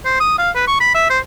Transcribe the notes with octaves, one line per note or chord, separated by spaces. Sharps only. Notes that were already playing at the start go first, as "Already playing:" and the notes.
C5
D#6
F5
B4
C#6
B5
E5
C5